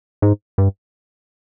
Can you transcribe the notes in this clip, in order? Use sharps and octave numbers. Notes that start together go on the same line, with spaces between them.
G#2
G2